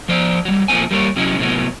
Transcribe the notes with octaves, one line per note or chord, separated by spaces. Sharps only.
F3 C5 D5
F#3 G3
A#2 F3 A3 C4 G#5
G3 A#3 B4 C#5
C3 F#3 G#3 C#4 E4
A2 C3 F#3 B3